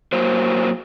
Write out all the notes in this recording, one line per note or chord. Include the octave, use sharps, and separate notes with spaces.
F#3 A#3 C5